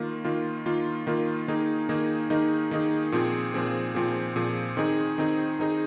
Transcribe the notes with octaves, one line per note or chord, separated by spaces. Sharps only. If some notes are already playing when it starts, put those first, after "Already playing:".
Already playing: D#3 A#3 F4
D#3 A#3 F4
D#3 A#3 F4
D#3 A#3 F4
D#3 A#3 D#4 G#4
D#3 A#3 D#4 G#4
D#3 A#3 D#4 G#4
D#3 A#3 D#4 G#4
A#2 F3 C4 G#4
A#2 F3 C4 G#4
A#2 F3 C4 G#4
A#2 F3 C4 G#4
D#3 C4 D#4 G#4
D#3 C4 D#4 G#4
D#3 C4 D#4 G#4